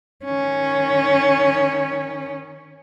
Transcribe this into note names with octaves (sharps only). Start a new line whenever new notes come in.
D#3 C#4